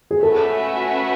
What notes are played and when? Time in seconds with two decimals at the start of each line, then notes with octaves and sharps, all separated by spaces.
0.11 G#4
0.22 A3 C#4 F#4 A4 B4 E5